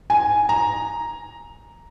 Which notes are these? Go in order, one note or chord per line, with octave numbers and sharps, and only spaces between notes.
G#5
A#5